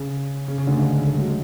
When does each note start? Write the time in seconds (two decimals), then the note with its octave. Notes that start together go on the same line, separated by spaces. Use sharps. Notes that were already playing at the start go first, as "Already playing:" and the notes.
Already playing: C#3
0.48 C#3
0.58 C#3
0.67 D2 D3
0.77 G#2 G#3
1.07 A3
1.14 G#3
1.21 F#3
1.28 G#3